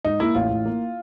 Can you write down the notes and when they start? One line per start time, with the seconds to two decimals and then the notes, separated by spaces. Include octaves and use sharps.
0.05 G#2 D#4
0.20 A#3 E4
0.35 A1 F4
0.51 A1
0.65 A#3